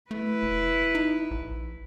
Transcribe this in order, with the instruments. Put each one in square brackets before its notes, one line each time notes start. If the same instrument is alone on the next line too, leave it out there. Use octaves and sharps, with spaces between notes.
[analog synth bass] A3 [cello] E4 B4
[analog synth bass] F1
D#4
A#1